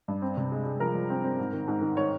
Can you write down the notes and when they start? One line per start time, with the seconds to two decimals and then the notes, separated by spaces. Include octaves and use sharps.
0.08 G2
0.22 C4
0.37 C3
0.52 G#3
0.65 G#3
0.80 F3 A#4
0.94 F3
1.10 C4
1.24 C4
1.39 G#2
1.53 D#3
1.68 G#2
1.82 D#3
1.97 D#3 C#5